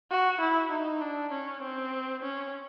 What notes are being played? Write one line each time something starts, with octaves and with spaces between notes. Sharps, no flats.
F#4
E4
D#4
D4
C#4
C4
C#4